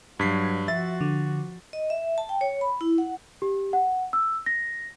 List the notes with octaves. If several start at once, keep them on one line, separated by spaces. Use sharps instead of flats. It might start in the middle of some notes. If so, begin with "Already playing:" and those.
G2 F#3 G#6 B6 C7
F3 F#4 E5 A6
D3
D#5
E5
A5
G5
C#5
B5
E4
F#5
G4
F#5
E6
A#6